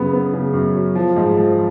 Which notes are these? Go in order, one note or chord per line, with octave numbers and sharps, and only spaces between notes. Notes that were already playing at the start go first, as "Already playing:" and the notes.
Already playing: F#2 C#3 B3
B3
C#3
F#2
F#3
F3
G#2
F3